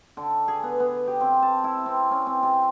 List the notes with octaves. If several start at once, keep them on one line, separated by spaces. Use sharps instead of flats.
D3
G#4
B3
B3
G4
C4
A5
E4
C4
C#4
C4
C3